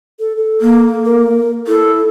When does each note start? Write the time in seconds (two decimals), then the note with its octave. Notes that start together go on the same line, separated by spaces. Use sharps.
0.19 A4
0.37 A4
0.61 A#3
1.05 A#4
1.67 E4 A4